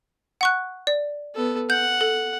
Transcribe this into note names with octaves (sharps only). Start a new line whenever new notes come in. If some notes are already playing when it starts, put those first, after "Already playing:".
F#5 C#6 F#6
D5
B3 A4
F#5 G6
A4